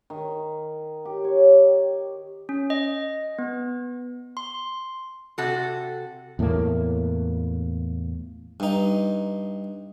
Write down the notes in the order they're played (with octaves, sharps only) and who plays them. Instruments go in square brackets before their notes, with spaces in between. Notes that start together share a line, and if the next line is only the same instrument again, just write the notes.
[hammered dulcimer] D#3
G4
C#5
[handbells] C#4
D#5
B3
C6
[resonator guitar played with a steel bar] C3 F#4 A4
[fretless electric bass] E2 A2 A3 A#3
[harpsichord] G2 D#4